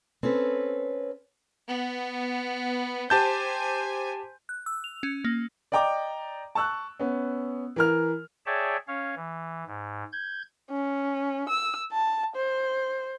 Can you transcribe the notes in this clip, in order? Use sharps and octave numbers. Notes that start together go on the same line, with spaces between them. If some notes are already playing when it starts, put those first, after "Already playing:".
C4 C#4 A4 B4
B3
G4 C5 G#5 A5 G6
F#6
E6
F7
C#4
A#3
D5 D#5 G5 A#5 D6
A5 C#6 E6 F#6
B3 C#4
E3 A#4 F6
G#4 C#5 D5 E5 G5 A5
C#4 C#5 F5
E3
G#2
G6 G#6
C#4
E6
A5
C5